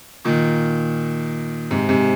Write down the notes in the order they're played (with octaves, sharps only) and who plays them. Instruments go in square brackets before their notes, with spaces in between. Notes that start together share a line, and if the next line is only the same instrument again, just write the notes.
[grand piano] A#2 D#3
G#2 C3
G#2 C3